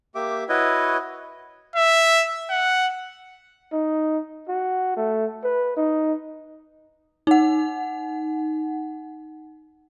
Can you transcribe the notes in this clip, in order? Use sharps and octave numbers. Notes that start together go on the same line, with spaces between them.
A#3 G4 E5 D6
E4 F#4 B4 C#5 D#5
E5
F#5
D#4
F#4
A3
B4
D#4
D#4 F#5